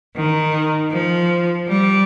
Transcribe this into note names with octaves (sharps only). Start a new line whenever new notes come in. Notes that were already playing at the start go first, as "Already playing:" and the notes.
D#3
F3
G3